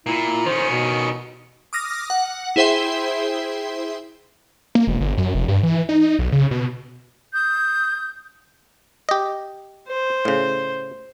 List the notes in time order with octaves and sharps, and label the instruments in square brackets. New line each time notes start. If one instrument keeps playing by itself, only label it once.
[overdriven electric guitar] A#2 [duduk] E4
[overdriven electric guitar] D#3 C#4 [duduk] C5
[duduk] B2
[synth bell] D6 D#6 F6 A#6
F#5
E4 G#4 C5 E5 G5 C6
[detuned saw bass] A#3
E1
G1
F#2
F1
G2
E3
D#4
B1
C#3
B2
[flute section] D#6 G6
[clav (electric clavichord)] G4 D#5
[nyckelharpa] C5
[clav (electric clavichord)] A2 C#3